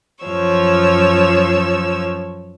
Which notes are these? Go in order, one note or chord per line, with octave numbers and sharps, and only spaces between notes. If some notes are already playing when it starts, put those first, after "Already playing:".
F#2 F3 C#5 E6